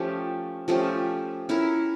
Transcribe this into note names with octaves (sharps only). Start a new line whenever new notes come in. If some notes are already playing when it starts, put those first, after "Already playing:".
Already playing: F3 A3 C#4 G4
F3 A3 C#4 G4
C#4 E4 A#4